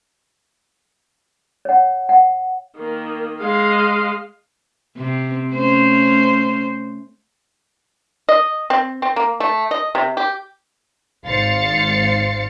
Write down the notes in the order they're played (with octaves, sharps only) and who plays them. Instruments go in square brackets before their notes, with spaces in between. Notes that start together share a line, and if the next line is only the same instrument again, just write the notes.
[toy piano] C#5 F#5
F#5
[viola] D#3 A#3
G#3 F5
[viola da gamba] C3 C4
A3 C#4 C5
[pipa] D#5
C4
C4
A#3
A3
D#5
C3
G4
[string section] G#1 C5 F5 A6 C7 C#7